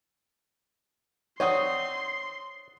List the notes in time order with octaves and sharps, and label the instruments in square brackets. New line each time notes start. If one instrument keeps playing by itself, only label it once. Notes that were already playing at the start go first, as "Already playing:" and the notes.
[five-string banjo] C4 D#4 [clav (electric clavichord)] C#5 [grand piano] D5 F#5 D#6 [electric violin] C6